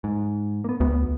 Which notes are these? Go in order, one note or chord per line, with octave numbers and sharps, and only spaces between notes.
G#2
A#3 B3
D2 B3